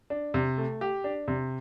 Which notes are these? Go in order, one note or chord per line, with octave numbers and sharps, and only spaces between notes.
D4
C3
A3
G4
D4
C3